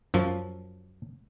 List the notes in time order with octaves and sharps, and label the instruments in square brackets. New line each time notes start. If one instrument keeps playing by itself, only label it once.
[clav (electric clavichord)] F#2 F3